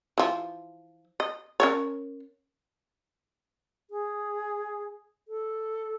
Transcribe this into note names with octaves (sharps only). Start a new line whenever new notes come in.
E3 F3
D#5
C#4 A#4 C#5
G#4
A4